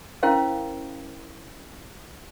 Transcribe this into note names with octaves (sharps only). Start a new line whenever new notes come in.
C#4 E4 A#4 C5 F5